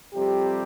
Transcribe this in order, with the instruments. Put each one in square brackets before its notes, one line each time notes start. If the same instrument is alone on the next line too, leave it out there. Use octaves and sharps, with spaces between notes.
[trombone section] F2 C3 G3 G4